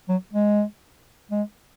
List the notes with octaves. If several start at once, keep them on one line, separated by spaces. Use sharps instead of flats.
F#3
G#3
G#3